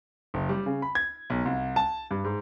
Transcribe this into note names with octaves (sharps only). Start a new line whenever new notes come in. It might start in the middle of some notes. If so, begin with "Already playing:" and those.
F#1
G3
C#3
B5
G#6
B1
C2
A5
G2
G#2